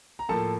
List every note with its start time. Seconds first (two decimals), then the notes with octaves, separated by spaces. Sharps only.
0.19 A#5
0.29 A2 F3 A#3 A4 A5